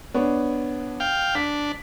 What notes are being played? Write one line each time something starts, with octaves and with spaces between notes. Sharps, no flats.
B3 D4 C#5
F5 G5
D4 B6